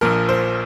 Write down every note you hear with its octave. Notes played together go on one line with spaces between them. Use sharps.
A#1 A#2 F3 A#4
C5